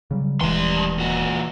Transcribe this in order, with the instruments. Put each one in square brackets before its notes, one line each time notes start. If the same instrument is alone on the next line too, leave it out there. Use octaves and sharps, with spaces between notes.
[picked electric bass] C#3 F#3 G3
[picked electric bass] D#1 G#3 [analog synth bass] E3 [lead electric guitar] G3 C6
[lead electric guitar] A#2 F#4